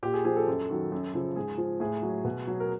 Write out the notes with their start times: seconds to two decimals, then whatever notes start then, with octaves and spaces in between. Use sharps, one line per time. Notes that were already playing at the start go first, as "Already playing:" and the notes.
0.03 A#2 G4
0.14 G#4
0.24 F3 G#4
0.36 A4
0.47 F#2
0.69 D#3 F#3
0.92 F#2
1.14 C#3 F3
1.36 G#2 G#4
1.58 F3
1.80 A2 G#4
2.03 F#3
2.24 B2
2.47 F#3
2.60 A#4